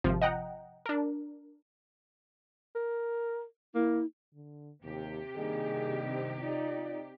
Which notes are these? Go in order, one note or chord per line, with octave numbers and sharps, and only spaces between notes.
G#1 C3 F3
D#5 F#5 G5 A#5
D4 A#4
A#4
A#3 E4
D3
D#2 C3 G4
G2 D#3 A#3 G#4
C4
D#4 F4 D5